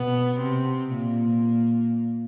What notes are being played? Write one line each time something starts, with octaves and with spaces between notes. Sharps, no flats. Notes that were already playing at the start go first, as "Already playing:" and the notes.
Already playing: B2 B3
C3 C4
A#2 A#3